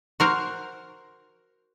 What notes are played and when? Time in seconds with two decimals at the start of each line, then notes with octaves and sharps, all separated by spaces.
0.20 F#4 A#4 C5